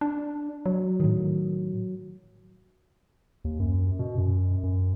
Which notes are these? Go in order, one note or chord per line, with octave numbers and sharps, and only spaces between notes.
D4
F#3
A2 D#3
D#2
F#2
B2
F#2
F#2